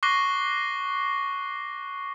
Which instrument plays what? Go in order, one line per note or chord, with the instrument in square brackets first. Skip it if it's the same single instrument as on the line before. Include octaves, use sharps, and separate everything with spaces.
[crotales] C#6 D6 F#6 A#6 C7 G7